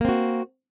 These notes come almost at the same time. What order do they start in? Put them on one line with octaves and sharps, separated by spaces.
A#3 C4 F#4